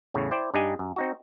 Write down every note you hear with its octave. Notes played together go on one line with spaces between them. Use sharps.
E2 A2 C#3
E4 C5 D5 G5
G2 D4 D#4 G4 D#5 G#5
F#2
C4 D#4 F#4